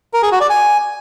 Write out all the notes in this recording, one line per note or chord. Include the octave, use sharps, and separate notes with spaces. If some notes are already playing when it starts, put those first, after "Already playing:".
A#4
G#4
F#4
D5
G#5